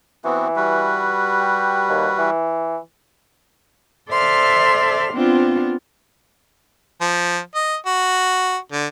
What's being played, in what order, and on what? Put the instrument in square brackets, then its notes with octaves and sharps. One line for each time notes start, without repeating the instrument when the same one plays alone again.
[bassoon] E3 [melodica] B3 C4 F#4
[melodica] G3 F#4 B4
[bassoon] G4
D#2
E3
[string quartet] A4 C5 D5 E5 C6 F6
B3 C4 D4 F4
[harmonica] F3
D#5
F#4
D3